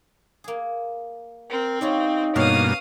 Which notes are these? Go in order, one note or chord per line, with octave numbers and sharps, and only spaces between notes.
A#3 G#4
C4 A#4
G3 C#4 D#4 F4
G2 B2 A#3 B3 C#4 F5 D#6